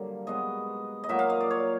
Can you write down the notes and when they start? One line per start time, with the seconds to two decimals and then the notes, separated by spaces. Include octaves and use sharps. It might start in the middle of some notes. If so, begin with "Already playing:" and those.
Already playing: G2 D3 F#3 A#3
0.27 B2 G#3 B3 D#5
1.04 D#5
1.09 A#2 F#3 A#3 E5
1.19 F5
1.30 D#5
1.40 D5
1.50 C#5